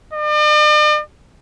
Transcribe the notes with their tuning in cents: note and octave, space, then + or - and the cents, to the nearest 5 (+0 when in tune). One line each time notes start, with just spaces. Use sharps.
D5 +45